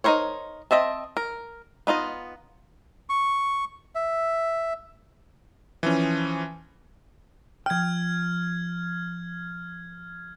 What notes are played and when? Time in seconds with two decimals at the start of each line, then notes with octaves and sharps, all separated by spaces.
0.04 D#4 F4 A#4 C5 C#5
0.71 C4 D#5 E5 A5
1.17 A#4
1.87 B3 D#4 F4 D#5
3.09 C#6
3.95 E5
5.83 E3 F3 C#4
7.66 F3 G5 F6 G#6